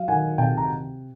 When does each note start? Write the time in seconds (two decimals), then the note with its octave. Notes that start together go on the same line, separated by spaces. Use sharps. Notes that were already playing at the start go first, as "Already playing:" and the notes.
Already playing: F#3 F5
0.08 D#3 F#5 G#5
0.38 C3 G5 A5
0.57 A#5